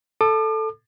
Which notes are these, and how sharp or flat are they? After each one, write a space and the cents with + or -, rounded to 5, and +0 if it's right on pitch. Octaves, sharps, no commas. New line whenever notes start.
A4 +0 D6 +40